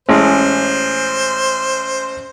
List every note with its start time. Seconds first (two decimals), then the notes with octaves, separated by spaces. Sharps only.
0.09 A1 G#3 C#4 C5